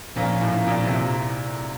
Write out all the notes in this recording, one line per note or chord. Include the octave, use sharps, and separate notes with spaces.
A#2 F3 A#3 C#4 F4
A2
A#2
C3